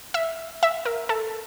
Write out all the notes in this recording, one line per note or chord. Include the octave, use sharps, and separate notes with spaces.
E5
E5
A#4
A4